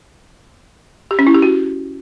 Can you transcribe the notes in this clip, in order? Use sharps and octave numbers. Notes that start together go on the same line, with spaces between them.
G4
C#4
E4
G4
F#4